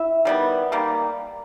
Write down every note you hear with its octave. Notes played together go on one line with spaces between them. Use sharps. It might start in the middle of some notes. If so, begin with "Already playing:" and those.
Already playing: E4 E5
D#3 G3 B3
D#3 G3 A#3